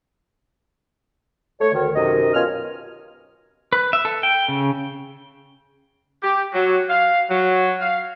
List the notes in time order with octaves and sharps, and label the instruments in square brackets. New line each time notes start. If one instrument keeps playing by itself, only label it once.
[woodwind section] A3 C#5
D2 D#3
F#2 C3 D#3 A#4 D#5
B2 C#4 F4 G#5 F6
[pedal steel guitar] B4
E5
A4
G5
C#3
[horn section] G4
F#3
F5
F#3
F5